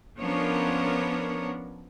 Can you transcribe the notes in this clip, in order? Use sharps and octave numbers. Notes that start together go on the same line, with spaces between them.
F3 B3 C#4 D4 A#4 C#5